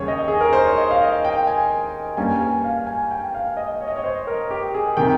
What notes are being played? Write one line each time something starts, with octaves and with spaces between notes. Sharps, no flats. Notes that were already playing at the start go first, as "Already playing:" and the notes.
Already playing: D#2 C#3 G3 G#4 C#5
D#5
G#4
A#4
C5
C#5
D#5
F5
D#5
G5
G#5
G2 G3 A#3 C#4 G#5
G#5
F5
G#5
G5
F5
D#5
C#5
D#5
C#5
C5
A#4
G4
G#4
C3 D#3 G5